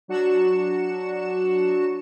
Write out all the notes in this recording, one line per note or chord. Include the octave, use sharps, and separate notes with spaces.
F#3 D4 F#4 C#7 E7